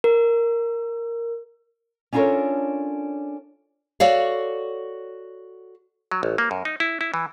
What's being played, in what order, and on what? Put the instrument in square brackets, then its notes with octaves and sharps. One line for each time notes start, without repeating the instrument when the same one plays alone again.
[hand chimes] A#4
[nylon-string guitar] C#4 D4 F4 A4 A#4 C#5
F#4 A4 C#5 D5 F5
[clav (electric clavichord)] F#3
A1
A#3
F#2
D#4
E4
E4
E3